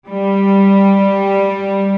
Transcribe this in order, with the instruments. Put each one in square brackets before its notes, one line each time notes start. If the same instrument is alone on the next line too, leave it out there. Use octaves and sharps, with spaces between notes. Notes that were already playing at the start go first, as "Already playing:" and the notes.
[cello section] G3